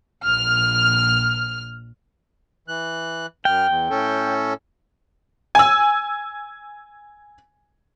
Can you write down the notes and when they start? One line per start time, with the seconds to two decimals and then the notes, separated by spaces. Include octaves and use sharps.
0.24 A#1 F6
2.68 E3 F#6
3.45 F#2 G5 F6
3.68 E2
3.90 A2 C#4 A4
5.55 G#5 E6